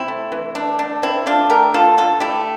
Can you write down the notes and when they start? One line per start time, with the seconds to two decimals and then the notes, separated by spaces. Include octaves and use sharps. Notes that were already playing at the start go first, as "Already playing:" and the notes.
Already playing: C3 C4 E4
0.08 A3
0.32 E3
0.55 A3 D4
0.79 D3 D4
1.02 D3 C4 E4
1.26 A3 D4 F4
1.50 A3 G4 A#4
1.74 D3 F4 A4
1.97 D3 F4 A4
2.20 A3 E4 G4